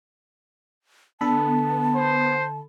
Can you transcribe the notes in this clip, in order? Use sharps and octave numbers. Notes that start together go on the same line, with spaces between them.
D3 B3 A4 A5 B5
C5